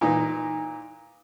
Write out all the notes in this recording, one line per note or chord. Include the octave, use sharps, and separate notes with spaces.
A#2 E3 D#4